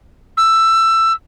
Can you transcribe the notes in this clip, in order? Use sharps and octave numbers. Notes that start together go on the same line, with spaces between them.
E6